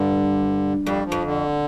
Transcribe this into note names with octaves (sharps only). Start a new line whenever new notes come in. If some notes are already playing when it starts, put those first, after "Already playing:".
Already playing: G2 D3
F2 G3
F3
F2
D3